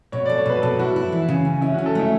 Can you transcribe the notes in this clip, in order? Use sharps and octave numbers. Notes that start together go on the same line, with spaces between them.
B2 C#5
D5
A4
C#5
B2 B4
B2 A4
E4 F#4
E4
E3
C#3
C#4
C#4 E4
F#4
C#4
A4
A3 E4